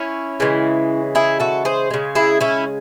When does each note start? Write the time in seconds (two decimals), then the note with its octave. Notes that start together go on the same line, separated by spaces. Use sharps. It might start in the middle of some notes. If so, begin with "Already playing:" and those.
Already playing: C#4 E4
0.40 C#3 E3 G#3
1.15 E4 G#4
1.40 F#4 A4
1.65 G#4 C5
1.91 C#3 G#3
2.15 E4 G#4
2.41 C#4 E4